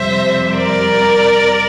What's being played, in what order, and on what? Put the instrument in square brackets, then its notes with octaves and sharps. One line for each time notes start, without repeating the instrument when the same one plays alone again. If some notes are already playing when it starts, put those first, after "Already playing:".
Already playing: [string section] F2 C3 G3 C5 E5
A#4 D5